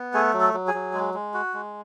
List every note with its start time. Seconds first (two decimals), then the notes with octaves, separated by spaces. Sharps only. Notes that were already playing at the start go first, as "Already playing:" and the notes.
Already playing: B3
0.14 A3 G#4
0.34 F#3
0.41 A4
0.54 F#3
0.67 G#4
0.74 F#3
0.94 G#3
1.14 G#3
1.34 F#4
1.54 G#3